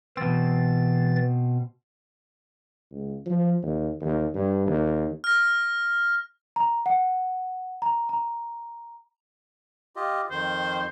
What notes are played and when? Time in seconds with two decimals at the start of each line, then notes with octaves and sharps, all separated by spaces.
0.17 B2 E3 C4 A6
2.91 C#2
3.26 F3
3.63 D#2
4.01 D#2
4.34 G2
4.66 D#2
5.24 F6 A#6
6.56 A#5
6.86 F#5
7.82 A#5
8.09 A#5
9.96 F4 G4 D#5
10.31 F2 D#3 C5